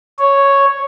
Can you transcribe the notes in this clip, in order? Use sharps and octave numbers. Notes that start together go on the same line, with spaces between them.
C#5